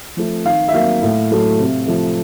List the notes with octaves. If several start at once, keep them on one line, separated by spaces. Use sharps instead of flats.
F3 A3
D#3 F5
E5
F#3 A#3 F5
A2
F#3 A3
C3
F3 A3